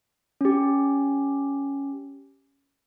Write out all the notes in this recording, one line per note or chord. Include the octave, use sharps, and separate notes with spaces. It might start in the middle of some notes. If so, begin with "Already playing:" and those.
C#4 G4